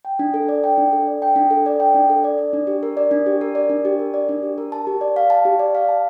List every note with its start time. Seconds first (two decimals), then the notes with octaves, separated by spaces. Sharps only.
0.05 G5
0.19 D4
0.34 A4
0.49 D5
0.64 G5
0.78 D4
0.93 A4
1.07 D5
1.22 G5
1.36 D4
1.51 A4
1.66 D5
1.80 G5
1.94 D4
2.10 A4
2.24 D5
2.38 D5
2.53 D4
2.67 G4
2.83 A#4
2.97 D5
3.11 D4
3.26 G4
3.41 A#4
3.55 D5
3.69 D4
3.85 G4
3.99 A#4
4.14 D5
4.29 D4
4.43 G4
4.58 A#4
4.72 A5
4.87 G4
5.01 D5
5.16 F5
5.30 A5
5.45 G4
5.59 D5
5.75 F5
5.89 A5